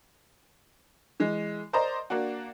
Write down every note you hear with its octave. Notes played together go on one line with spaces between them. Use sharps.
E3 G#3
A#4 C5 D5 D#5 A#5 C6
A#3 D4 F#4